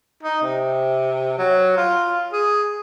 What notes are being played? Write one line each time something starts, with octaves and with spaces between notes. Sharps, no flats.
D#4
C3
F#3
F4
G#4